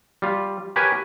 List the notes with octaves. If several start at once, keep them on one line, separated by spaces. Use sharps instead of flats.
G3 F4
G4 A#4 B4 C#5 G#5